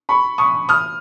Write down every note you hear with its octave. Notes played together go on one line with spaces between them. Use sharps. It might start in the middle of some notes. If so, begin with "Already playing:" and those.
B5 C#6
C#6 D#6
D#6 F6